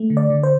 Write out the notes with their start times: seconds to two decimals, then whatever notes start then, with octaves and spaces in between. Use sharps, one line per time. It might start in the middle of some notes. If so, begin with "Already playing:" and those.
Already playing: A3
0.10 D3
0.17 D5
0.30 D3
0.43 C5